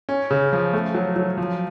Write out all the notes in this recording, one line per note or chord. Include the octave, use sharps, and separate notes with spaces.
C#4
C#3
F3
A3
F#3
F#3
F3